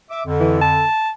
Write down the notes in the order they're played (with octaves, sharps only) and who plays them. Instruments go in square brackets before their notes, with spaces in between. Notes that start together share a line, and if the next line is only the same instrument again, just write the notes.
[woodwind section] E5 D6
F2 D3
[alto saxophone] E3
A5